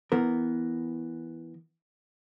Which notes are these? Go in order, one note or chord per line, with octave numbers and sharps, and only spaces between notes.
E3 B3 A#4